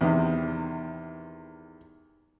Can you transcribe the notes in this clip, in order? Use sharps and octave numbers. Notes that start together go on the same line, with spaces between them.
E2 C3 D#3